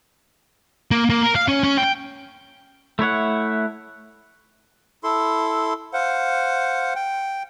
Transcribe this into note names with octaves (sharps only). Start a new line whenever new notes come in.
A#3
A#3
A#4
F5
C#4
C#4
G5
A3 E4 C#5 F#5
E4 A4 C6
C5 F5 F#5
G5